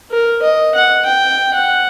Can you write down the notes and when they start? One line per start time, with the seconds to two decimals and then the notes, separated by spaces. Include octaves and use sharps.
0.11 A#4
0.42 D#5
0.74 F#5
1.05 G5
1.54 F#5